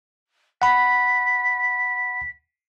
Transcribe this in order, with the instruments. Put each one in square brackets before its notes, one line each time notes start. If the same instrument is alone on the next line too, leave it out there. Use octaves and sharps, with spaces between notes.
[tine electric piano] F#5 B5 [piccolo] B6